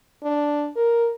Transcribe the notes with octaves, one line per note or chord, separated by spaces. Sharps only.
D4
A#4